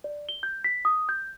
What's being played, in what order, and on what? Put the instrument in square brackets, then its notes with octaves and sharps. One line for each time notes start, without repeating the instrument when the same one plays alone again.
[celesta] D5
G7
G6
B6
D#6
G6